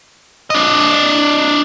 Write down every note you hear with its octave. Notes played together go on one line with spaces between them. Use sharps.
D4 D#5